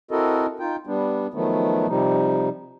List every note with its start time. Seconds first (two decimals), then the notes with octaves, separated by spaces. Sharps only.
0.11 C4 E4 F#4 A4 A#4 D#5
0.60 D#4 F4 G5
0.87 G3 B3 D4
1.34 D#3 F3 F#3 A3 B3
1.88 C3 F3 G3 D#4